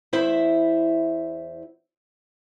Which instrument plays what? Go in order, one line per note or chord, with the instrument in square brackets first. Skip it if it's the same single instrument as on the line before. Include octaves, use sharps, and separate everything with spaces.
[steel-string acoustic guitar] E2 E4 C5 E5